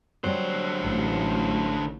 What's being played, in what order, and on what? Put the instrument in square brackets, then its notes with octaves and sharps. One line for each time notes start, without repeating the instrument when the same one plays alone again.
[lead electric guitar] D3 C5 [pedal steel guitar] F#3 [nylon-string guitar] G3 C4 C#5
[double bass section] A1